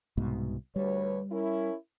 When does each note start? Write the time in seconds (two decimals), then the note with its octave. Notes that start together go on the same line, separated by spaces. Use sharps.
0.17 C2 G#2 B2
0.76 D2 G3 B4 C#5
1.32 C#4 E4 A#4